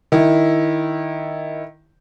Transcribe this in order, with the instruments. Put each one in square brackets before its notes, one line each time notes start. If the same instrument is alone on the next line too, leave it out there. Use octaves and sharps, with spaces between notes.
[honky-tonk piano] D#3 E4